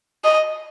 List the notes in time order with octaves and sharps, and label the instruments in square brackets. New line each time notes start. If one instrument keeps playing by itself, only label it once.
[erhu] D#5